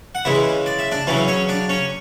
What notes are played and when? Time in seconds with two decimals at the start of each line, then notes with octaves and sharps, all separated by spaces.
0.15 F#5
0.25 C#3 E3 G#3 E4 E5
0.66 D5
0.79 E5
0.92 D4 D5
1.07 C#3 E3 F#3 C#4 E4
1.28 C#4 C#5
1.49 D4 D5
1.69 C#4 C#5